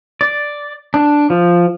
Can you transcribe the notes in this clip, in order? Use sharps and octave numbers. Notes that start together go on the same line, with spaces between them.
D5
D4
F3